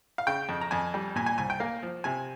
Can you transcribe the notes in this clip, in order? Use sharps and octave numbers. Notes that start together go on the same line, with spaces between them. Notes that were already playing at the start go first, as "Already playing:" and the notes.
F5
C#3 G5
F2
A#5
F2 G#5
G3
A#2 G#5
G#5
C2 G#5
G5
A#3 F5
F3
C3 G#5